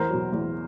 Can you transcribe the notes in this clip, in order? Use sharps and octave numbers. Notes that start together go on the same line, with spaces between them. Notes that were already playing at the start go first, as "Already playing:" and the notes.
Already playing: E2 A#4 C5
B2 F#3
E2